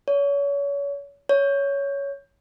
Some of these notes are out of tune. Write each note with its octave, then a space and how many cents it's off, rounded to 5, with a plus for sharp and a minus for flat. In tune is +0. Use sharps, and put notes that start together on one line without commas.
C#5 +35
C#5 +10